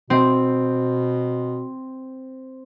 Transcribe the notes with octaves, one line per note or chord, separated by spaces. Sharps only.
B2 C4